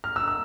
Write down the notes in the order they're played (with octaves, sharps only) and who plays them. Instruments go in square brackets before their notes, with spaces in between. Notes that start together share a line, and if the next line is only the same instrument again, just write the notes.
[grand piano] F6
E6
E6